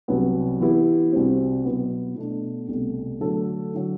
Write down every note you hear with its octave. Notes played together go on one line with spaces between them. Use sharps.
C2 C3 F#3 B3
E3 B3 E4 G4
C2 C3 G3 C4 F#4
B2 F#3 B3
B2 A3 D4
C2 B2 A3
D3 F#3 A3 D4 A4
D3 F#3